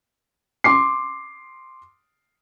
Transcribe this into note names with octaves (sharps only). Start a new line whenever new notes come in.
C6 D6 C7